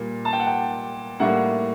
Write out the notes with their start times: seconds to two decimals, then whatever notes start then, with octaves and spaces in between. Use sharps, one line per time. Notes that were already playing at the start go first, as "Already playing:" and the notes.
Already playing: A#2 G3 A#3
0.25 A5
0.33 G5
0.40 F#5
0.47 G5
1.20 A2 G3 A#3 F#5